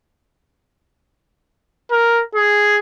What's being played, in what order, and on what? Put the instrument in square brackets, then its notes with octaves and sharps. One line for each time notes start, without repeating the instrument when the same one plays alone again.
[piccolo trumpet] A#4
G#4